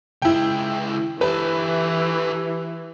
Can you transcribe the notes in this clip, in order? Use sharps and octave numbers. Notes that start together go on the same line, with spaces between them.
C#2 E4 G#4 G5
E3 G4 A4 B4